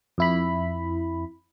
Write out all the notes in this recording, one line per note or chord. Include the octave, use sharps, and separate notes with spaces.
F2 E4 B5